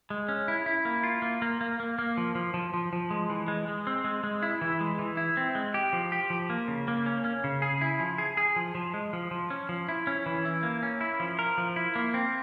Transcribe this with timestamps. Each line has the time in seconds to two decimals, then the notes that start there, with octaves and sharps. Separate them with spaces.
0.10 G#3
0.28 C#4
0.48 E4
0.66 E4
0.85 A#3
1.03 F4
1.22 A#3
1.42 A#3
1.61 A#3
1.80 A#3
1.99 A#3
2.17 F3
2.35 F3
2.54 F3
2.74 F3
2.93 F3
3.11 G#3
3.30 E3
3.48 G#3
3.68 G#3
3.87 C4
4.04 G#3
4.23 G#3
4.43 E4
4.61 E3
4.80 G#3
4.99 E3
5.17 E4
5.37 C4
5.55 G#3
5.74 G4
5.93 F3
6.12 G4
6.30 F3
6.50 A#3
6.68 C#3
6.88 A#3
7.06 C#4
7.25 C#4
7.44 C#3
7.62 G#4
7.81 E4
8.00 F3
8.18 G#4
8.37 G#4
8.56 F3
8.75 F3
8.94 G#3
9.13 F3
9.31 F3
9.50 C#4
9.69 F3
9.89 E4
10.07 C#4
10.26 E3
10.45 E4
10.63 A#3
10.83 C#4
11.01 E4
11.20 F3
11.39 A#4
11.58 F3
11.76 E4
11.96 A#3
12.14 C4